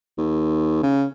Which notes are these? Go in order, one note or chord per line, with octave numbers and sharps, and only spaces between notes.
D#2
C#3